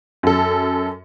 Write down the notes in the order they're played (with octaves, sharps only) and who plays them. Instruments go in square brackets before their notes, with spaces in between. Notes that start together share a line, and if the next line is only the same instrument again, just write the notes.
[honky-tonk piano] F#2 A4